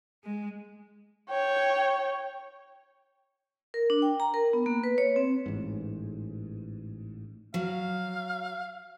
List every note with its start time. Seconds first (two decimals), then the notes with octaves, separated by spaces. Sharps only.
0.24 G#3
1.29 C#5 G5
3.74 A#4
3.90 D4
4.02 G5
4.20 A#5
4.34 A#4
4.53 B3
4.66 A#3
4.84 B4
4.98 C#5
5.16 C4
5.46 A1 G#2
7.54 F#3 F5